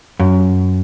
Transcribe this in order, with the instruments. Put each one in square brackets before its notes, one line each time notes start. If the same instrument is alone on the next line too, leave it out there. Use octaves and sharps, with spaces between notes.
[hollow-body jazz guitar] F#2